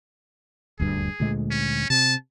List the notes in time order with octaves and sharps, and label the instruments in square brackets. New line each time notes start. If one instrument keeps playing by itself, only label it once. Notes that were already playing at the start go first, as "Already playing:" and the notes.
[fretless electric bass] D#1 D2 G2 [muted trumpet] G#4
[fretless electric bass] D2 A#2 G#3
[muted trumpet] C#4
[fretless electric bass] C3 [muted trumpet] A5